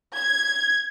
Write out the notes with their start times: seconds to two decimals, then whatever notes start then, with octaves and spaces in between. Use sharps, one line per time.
0.14 G#6